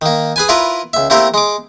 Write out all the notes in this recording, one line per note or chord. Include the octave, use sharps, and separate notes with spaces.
D#3 A#3
G#4 B4 G#5
E4 F4 A#4 B4
C#2 E5
A3 A#3 C4 E4 G4 A#4
G#3 D6